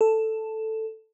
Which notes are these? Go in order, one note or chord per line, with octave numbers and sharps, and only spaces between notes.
A4